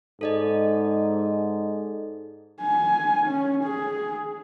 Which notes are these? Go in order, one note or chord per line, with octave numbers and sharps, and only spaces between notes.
G#2 A4 D5 D#5
G#5
C#4
G#4